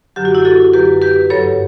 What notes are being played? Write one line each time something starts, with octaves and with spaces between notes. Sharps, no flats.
F#2 D3 F#3 G4
F#4
E4 G4
F#4 A4
F#2 D3 F#3 G4 B4
G4 B4
G2 F#3 A4 C#5